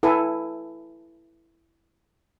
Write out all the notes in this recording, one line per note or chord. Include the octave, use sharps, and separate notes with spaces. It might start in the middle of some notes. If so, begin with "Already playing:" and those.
E4 A4 B4 G#5